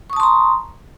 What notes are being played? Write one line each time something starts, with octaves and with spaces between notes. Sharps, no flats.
A5 A#5 C6 C#6 D#6